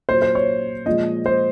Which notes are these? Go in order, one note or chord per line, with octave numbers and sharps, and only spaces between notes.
A#2 F#3 C5
C5
C#5
A#2 F3 G#3 D#5
C5